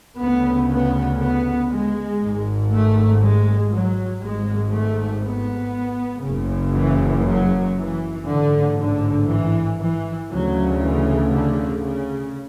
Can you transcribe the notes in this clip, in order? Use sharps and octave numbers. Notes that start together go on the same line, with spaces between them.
D2 C#3 B3
B3
B3
G#3
G#1 G#2
A3
G#3
F#3
G#1 G#2 G#3
A3
B3
F#1 F#2 C#3
E3
F#3
E3
A1 G#2 D3
D3
E3
E3
D2 C#3 F#3
E3
D3
C#3